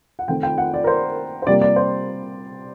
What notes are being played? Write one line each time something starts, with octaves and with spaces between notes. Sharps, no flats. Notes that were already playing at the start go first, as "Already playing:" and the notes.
F#5
D#3 A3 C4 G5
G5
F#5
D5
A#4
C5
C5
C3 G3 A#3 D5
D5
C5